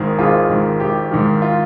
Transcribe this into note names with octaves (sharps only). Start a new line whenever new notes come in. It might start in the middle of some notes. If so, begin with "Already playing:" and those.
Already playing: G#1 G#2 D#3
G#1 F4 G#4
G#2 D#3
G#1 G4
G#2 D#3
F4